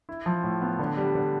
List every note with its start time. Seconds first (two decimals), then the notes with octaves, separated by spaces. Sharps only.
0.09 E4
0.26 F3
0.43 A2
0.61 B3
0.79 D3
0.97 G3
1.15 D3